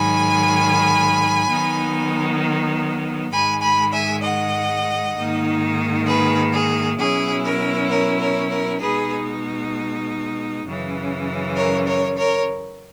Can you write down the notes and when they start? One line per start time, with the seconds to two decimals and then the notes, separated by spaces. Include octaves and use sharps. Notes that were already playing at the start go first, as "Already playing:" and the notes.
Already playing: G#2 D#3 F#3 G#5 B5
1.48 D#3 F#3 B3 D#4
3.31 G#2 D#3 G#3 G#5 B5
3.61 G#5 B5
3.92 E5 G#5
4.22 D#5 F#5
5.14 G#2 D#3 A#3 D#4
6.06 G#4 B4
6.52 G#4
6.97 B2 F#3 C#4 E4 G#4
7.43 A#4
7.89 A#4 C#5
8.19 A#4 C#5
8.50 A#4
8.80 B2 G#3 D#4 G#4 B4
10.64 F#2 C#3 E3
11.55 A#4 C#5
11.86 A#4 C#5
12.17 A#4 C#5